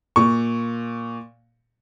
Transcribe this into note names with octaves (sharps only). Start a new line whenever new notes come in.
A#2 C#6